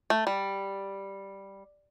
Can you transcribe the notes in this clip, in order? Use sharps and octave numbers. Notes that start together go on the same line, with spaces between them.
A3
G3